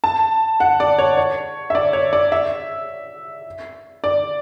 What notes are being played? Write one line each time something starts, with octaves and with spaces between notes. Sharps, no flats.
A5
F#5
D5
C#5
C#5
E5
D5
C#5
D5
E5
D5